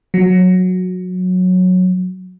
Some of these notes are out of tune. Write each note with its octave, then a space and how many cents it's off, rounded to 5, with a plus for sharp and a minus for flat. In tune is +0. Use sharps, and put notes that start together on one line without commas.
F#3 -15